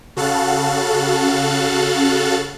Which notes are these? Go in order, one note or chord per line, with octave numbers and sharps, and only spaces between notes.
C#3 F#4 A4 F5 F#6 A6